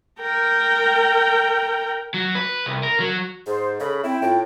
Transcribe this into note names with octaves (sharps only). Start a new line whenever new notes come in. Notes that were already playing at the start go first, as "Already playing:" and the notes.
A#4 G5
F#3
B4
C2
A#4
F#3
G#2 G#4 C5
C#3 A4 B5
C4 E4 G5
A2 F4